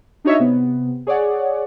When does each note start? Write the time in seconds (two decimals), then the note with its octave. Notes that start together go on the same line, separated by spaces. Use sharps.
0.25 D4 D#4 F#4 C#5 D#5 E5
0.39 C3 B3
1.07 G#4 C#5 D5 F#5